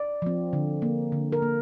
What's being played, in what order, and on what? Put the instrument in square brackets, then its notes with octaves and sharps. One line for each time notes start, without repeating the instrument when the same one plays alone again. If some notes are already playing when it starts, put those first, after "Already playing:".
Already playing: [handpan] D5
F3 C4
D3
A#3
D3
A#4
A#3